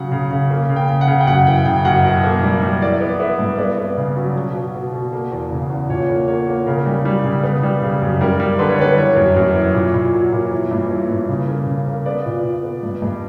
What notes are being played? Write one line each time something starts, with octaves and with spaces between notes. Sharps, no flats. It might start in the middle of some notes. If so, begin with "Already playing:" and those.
Already playing: C#3 F#3 F#5
C#3
C#3
A#3
C#3
G5
C#3
F#5
C#3
G5
F#2 F#5
E3 G5
C#3 G5
F#2 F#5
B2
A#3
G3
G3
E3 D5
B3
B3 E5
G2
B3 D5
B3
C#3
F#3
B2
B2
B2
B2
A#3
E2
C#3
E2
A#2 C#5
A#3
A#3 C#5
A#3
C#3 A#4
G3
G3
C#3
B3
G3
C#3
F#2
G3 A#4
G3
D3 B4
C#5
G3 B4
E3 C#5
F#2
F#2
E3
A#2
A#2
F#3
A#2
E3
G2
E3
G2
C#3
A#3
C#3
A#3
B3 D5
A#2
A#2
B3
G2
G2